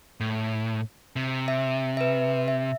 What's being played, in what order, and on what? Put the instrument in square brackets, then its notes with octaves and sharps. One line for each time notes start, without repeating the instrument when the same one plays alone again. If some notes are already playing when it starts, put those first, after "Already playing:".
[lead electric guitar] A2
C3
[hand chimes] E5
B4 E5
E5